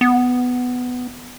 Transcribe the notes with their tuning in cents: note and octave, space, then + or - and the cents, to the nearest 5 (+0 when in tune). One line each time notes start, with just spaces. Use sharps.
B3 +10